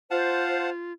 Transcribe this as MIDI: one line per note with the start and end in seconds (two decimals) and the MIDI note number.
0.11 0.93 65
0.11 0.66 72
0.11 0.70 77
0.11 0.70 78
0.11 0.70 81